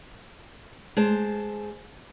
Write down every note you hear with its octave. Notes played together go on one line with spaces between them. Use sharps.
G#3 C5 A5